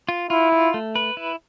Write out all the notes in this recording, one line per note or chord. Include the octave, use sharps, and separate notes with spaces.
F4
E4 F4
F4
A3
B4
E4